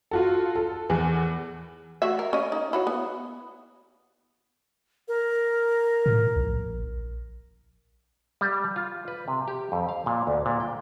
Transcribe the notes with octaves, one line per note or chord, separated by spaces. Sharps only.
F4 F#4 A4
A4
E2 E3
A3 F#4 E5
A#4
C#4 D#5
D#4
E4 F#4 C#5
B3
A#4
A2
A#1
G3
F4
B4
C3
G4
F2
F5
A#2
D2
A#2
G5